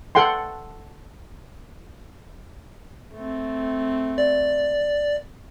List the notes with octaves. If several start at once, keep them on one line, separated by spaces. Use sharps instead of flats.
A4 F#5 G5 C6
A3 C4
D5